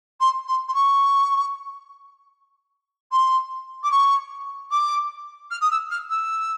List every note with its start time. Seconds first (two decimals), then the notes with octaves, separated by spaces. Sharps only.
0.20 C6
0.47 C6
0.68 C6
0.74 C#6
3.11 C6
3.83 D6
3.91 C#6
4.71 D6
5.50 F6
5.61 D#6
5.70 E6
5.90 F6
6.09 E6